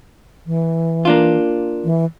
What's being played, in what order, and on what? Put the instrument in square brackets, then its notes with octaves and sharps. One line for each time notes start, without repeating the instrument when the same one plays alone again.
[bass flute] E3
[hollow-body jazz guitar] A#3 D4 F4
[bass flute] E3